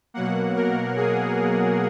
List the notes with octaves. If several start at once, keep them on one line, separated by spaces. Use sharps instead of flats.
B2 F#3 A#3 F#5
A#4
G#4